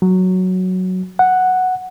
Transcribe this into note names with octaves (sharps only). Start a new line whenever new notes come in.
F#3
F#5